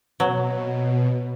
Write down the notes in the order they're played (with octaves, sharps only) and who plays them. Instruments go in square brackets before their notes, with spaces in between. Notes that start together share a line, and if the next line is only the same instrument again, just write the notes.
[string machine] B2 [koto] F#3